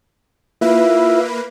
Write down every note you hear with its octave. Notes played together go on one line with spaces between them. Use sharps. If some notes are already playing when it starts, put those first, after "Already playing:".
A#3 E4 F4 B4 E5